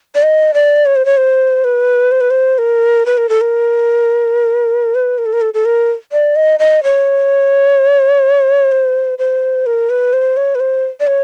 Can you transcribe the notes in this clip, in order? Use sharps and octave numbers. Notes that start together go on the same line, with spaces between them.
D5
D#5
D5
C#5
C5
C#5
C5
B4
C5
B4
C5
A#4
B4
A#4
A4
A#4
B4
A#4
A4
A#4
A4
A4
A#4
D5
D#5
D#5
C#5
C5
C5
A#4
B4
C5
C#5
B4
C5
D5
C#5